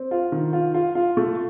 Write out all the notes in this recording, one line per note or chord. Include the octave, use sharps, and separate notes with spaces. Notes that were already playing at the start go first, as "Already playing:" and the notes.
Already playing: C4
F4
D#3
F4
F4
F4
A3